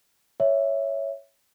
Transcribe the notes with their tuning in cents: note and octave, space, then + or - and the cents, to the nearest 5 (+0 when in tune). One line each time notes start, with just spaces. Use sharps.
C#5 +0 E5 +0